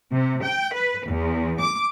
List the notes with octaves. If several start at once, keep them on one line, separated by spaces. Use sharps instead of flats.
C3
G5
B4
E2
D6